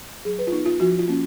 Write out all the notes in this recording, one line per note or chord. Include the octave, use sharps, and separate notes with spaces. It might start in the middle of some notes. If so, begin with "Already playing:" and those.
F#3 G#4
B4
F4
B3 D#4
F4
F3 F#4
F4
A#3 C#4